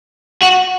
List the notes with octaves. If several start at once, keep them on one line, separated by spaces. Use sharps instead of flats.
F#4